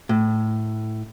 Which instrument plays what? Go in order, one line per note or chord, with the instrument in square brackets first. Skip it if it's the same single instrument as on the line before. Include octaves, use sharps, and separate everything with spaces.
[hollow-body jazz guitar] A2